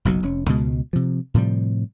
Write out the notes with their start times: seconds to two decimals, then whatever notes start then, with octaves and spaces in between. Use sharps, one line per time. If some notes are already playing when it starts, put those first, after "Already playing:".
0.05 F#1 B1 B2 F#3
0.23 F1 C#4
0.48 C#2 B2 G#3
0.93 C3 F3
1.34 A2 C3 F3 G3